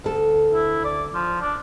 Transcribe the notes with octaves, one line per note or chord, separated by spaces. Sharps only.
D2 A4
E4
D5
F3
D4